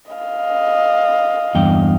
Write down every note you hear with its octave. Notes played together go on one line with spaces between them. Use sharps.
D#5 F5
E2 G2 G5